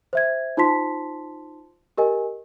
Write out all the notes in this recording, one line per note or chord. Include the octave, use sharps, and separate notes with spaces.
C5 E5 G#6
D#4 F4 C5 A5 C6 B6
G4 A#4 D#5 G#5